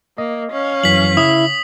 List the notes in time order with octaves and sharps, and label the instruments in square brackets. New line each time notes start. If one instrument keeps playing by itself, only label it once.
[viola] A#3 [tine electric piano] D#5
[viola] C#4 F5
[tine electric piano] F#2 E3 F#3 [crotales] B6 F#7
[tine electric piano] C#3 [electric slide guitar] E4 [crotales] D#6